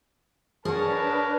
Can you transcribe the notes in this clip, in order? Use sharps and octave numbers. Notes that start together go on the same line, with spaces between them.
D4 G#4 A#4 B4 C#5 F#5 A5